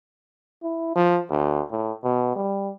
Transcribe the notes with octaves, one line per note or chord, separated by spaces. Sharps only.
E4
F3
D2
A2
B2
G3